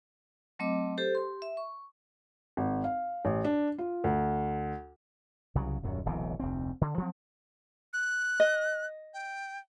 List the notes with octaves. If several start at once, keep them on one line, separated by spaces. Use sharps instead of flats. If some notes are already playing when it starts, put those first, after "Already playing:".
F#3 A3 C4 D#5 D6
G4 A4 C5
G4 C6
E5
C#6
G#1
F5
A1
D4
F4
D2
C2 C#3 F#3
D#1 F#2 F#3
D1 B1 C3 E3
F1 D2 C4
D3
F3 F#3 C4
F#6
D#5
G5